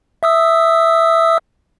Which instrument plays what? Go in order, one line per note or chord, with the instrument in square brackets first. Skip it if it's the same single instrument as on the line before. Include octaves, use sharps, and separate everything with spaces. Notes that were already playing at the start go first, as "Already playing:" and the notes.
[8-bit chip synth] E5 D#6 E6